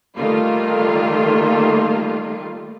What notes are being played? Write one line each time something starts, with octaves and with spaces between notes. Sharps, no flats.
D#3 G3 A3 A#3 F4